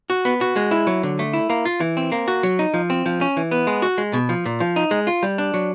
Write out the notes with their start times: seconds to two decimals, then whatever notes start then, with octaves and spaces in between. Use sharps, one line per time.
0.10 F#4
0.25 B3
0.41 F#4
0.56 G#3
0.71 E4
0.87 F#3
1.03 D3
1.19 A3
1.33 E4
1.50 A#3
1.65 F4
1.80 E3
1.97 C4
2.12 A#3
2.28 F#4
2.43 F#3
2.59 D#4
2.74 F3
2.90 C4
3.06 F3
3.21 C#4
3.37 E3
3.51 B3
3.67 G#3
3.82 F#4
3.98 G#3
4.13 B2
4.29 F3
4.46 A#2
4.60 F3
4.76 D#4
4.91 G#3
5.07 F4
5.23 G3
5.38 D4
5.54 F#3